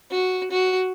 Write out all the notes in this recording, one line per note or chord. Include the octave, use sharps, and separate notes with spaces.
F#4
F#4